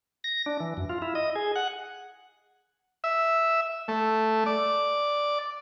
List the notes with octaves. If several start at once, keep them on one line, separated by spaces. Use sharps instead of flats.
A#6
D4
E3
F#2
F4
E4
D#5
G#4
F#5
E5
A3
D5